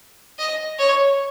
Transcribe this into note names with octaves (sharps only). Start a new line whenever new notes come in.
D#5
C#5